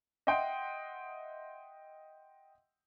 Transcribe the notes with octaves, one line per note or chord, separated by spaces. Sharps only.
D#5 E5 F#5 G5 C6